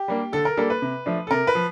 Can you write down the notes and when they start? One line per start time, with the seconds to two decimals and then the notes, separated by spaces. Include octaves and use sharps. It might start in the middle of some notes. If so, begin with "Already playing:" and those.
Already playing: G4
0.08 G3 A#3 D4
0.32 D3 A4
0.45 A#4
0.57 G3 A#3 D4 A4
0.70 B4
0.82 C3
1.06 F3 A3 D4
1.27 A4
1.31 C3 A#4
1.47 B4
1.55 F3